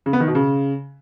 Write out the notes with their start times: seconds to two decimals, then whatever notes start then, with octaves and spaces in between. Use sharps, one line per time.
0.06 C#3
0.13 B3
0.20 D#3
0.28 B2
0.35 C#3